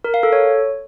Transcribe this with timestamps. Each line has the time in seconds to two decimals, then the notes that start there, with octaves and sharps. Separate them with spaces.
0.04 A#4
0.14 F5
0.23 A4
0.33 C#5